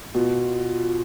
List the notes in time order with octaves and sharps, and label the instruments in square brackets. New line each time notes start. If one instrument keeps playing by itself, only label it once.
[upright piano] B2 [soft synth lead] F4